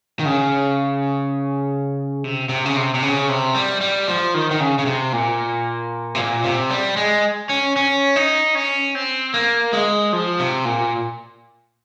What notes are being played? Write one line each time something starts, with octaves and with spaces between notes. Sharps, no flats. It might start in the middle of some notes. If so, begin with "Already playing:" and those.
D#3
C#3
C3
C3
C#3
C3
C3
C#3
C3
G3
G3
F3
D#3
D#3
C#3
C#3
C3
A#2
C3
A#2
C3
G3
G#3
C#4
C#4
D#4
C#4
C4
A#3
G#3
F3
C3
A#2